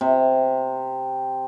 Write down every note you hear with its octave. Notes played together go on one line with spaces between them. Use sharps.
C3